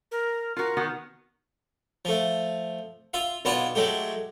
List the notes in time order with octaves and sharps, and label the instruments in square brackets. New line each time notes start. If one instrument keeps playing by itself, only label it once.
[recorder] A#4
[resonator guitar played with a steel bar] F4 F#4 [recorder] A#4
[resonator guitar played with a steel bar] D#3 B3 F#4
[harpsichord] F3 A3
F4 E5 F5
B1 B3 F4 D5 G#5 A5
F#3 G#3 A3 G4